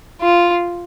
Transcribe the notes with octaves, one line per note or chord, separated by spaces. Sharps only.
F4